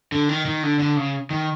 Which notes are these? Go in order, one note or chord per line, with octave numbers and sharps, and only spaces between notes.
D3
D#3
D#3
D3
D3
C#3
D#3